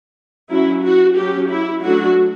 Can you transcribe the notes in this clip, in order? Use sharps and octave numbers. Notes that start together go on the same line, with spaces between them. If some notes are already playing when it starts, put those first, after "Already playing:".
F#3 C#4 E4
F#4
F#3 C#4 G4
E4
F#3 A3 D4 F#4